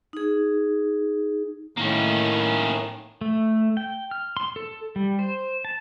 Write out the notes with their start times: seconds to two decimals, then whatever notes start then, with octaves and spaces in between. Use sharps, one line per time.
0.13 D#4 G#4
1.77 A2 D#3 A#3 C#4
3.21 A3
3.77 G5
4.11 F6
4.37 C6
4.56 A4
4.96 G3
5.19 C5
5.65 A5